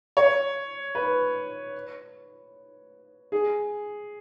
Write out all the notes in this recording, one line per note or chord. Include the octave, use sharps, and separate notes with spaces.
C#5
B4
G#4